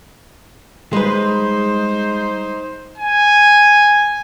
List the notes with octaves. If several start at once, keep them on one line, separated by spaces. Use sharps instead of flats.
G3 G#3 D#4 B4 C5
G#5